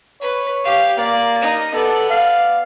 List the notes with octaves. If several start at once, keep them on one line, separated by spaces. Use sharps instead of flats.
B4 C#5
G4 F5
A#3 D5
D#4
B3 A4 D5
F5